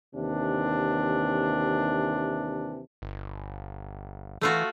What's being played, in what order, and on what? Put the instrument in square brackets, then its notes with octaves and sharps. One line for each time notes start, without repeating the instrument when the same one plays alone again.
[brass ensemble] D#2 C3 E3 D4
[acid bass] G1
[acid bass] E3 [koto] A3 F4 F#4